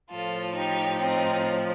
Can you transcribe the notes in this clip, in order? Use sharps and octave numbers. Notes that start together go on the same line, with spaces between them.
A2 F3 F4 A4
D#4 G4
C4 D#4